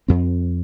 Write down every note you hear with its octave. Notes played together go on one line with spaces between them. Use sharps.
F2 C4